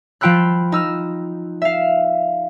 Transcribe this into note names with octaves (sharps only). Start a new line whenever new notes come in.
F3 F4 G5 B5 E6 F#6
D#4 E6 F6
E5 F5